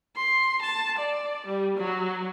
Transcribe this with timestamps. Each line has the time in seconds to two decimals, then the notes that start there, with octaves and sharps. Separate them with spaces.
0.17 C6
0.62 A5
0.98 D5
1.46 G3
1.77 F#3